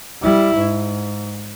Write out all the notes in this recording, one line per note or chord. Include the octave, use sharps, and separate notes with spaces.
G3 E4
G#2